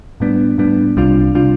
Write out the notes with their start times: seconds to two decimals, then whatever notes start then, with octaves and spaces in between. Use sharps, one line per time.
0.20 A2 G3 B3 D4
0.58 A2 G3 B3 D4
0.96 C2 C3 G3 D4 F4
1.35 C3 G3 D4 F4